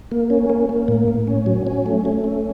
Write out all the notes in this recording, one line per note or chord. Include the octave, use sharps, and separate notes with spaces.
A#3
C#4
A#3
A#3
A2
A2
C#4
F#3
C#4
A3
A3
C#4